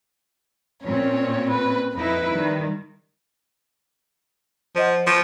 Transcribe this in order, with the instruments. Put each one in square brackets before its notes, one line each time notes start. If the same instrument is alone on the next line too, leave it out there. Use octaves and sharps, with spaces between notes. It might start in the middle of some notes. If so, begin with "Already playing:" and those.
[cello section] A#2 C4 C#4 [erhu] C#5
[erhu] B4
[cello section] F2 D#4 E4 [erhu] B4
[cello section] D#3 G3
[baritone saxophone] F3 [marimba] C5 D#5 F#5
[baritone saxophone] F3 [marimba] C#6